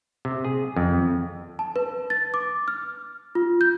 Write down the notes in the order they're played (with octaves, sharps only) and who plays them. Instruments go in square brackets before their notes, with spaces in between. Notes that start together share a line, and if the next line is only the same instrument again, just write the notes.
[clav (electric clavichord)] C3
G#4
F2
[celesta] A5
B4
A6
D6
F6
F4
G6